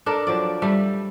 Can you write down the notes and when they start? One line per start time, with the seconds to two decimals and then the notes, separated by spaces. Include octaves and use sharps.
0.06 D4 A4 A#4
0.27 F3 F#3 D5
0.62 G3 A3